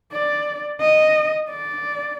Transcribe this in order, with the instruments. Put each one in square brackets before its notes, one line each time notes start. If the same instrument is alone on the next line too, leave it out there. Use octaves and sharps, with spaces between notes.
[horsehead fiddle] D5
D#5
D5